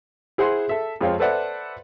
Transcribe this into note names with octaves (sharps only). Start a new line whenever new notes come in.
E4 G#4 C5 F#5 C6
A4 E5
F2 G#3 C4 F4 C#5
A4 B4 C5 D5 E5 F#5